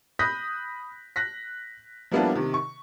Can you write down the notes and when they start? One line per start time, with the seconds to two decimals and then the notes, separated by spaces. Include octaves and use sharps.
0.19 B5 D#6 F#6 G6 A#6 B6
1.16 F#6 A#6 B6
2.11 F3 G3 A#3 B3 D4 E4
2.35 C3 D#3
2.54 C#6